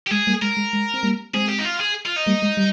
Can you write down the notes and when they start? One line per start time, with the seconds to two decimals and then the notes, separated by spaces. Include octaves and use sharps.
0.07 G4
0.11 G#3 G#4
0.27 G3 A#3
0.42 G#3 A#4
0.57 G#3
0.73 G#3
0.94 C4
1.03 G3 A#3
1.34 G#3 C4 G#4
1.49 G4
1.59 D#4
1.65 F4
1.80 G#4
2.06 F4
2.16 D#4
2.26 G3 A#3
2.42 G#3
2.57 G3